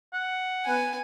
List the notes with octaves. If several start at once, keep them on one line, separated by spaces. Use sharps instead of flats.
F#5
B3 G#5